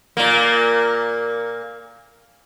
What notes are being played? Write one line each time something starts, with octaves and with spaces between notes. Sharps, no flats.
A#2 A#3